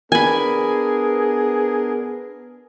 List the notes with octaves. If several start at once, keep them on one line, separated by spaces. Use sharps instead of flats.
B3 D4 G#4 A#4 G#5 B5